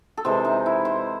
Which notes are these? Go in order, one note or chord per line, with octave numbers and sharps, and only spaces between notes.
A4
C3 E3 G#3 C5
D#4
E4
C5